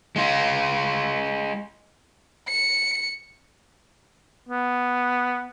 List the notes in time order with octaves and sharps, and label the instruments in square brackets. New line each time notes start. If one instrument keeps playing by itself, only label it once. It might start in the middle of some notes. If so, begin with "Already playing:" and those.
[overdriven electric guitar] G#3 F4
[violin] C#7
[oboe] B3